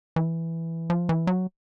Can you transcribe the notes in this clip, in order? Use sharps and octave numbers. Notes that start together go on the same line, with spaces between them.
E3
F3
E3
F#3